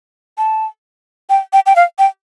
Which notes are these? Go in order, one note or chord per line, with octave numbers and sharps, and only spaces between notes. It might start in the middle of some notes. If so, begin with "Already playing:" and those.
A5
G5
G5
G5
F5
G5